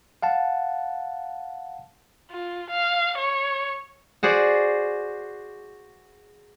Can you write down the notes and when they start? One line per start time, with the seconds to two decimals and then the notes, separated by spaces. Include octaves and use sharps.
0.22 F5 F#5 A5
2.31 F4
2.70 F5
3.17 C#5
4.23 F#4 G#4 C5 D5